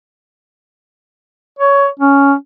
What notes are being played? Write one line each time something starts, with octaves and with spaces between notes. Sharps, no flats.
C#5
C#4